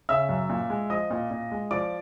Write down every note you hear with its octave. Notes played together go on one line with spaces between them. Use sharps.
C#3 E5 E6
F#2
A#2
G#3
F3 D#5 D#6
A#2
A#2
G#3
F3 D5 D6